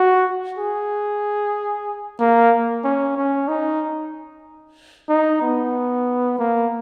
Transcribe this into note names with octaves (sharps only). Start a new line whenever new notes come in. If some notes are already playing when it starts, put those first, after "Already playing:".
Already playing: F#4
G#4
A#3
C#4
C#4
D#4
D#4
B3
A#3